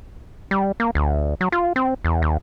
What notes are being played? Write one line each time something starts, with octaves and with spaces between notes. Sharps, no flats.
G3
A#3
D2
F#3
F4
C4
E2
D#2